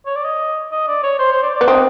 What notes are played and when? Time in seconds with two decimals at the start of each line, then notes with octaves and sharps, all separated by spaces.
0.06 C#5
0.16 D5
0.24 D#5
0.72 D#5
0.88 D5
1.03 C#5
1.19 C5
1.32 C5
1.43 D5
1.55 D5
1.61 B3
1.68 C4 D#5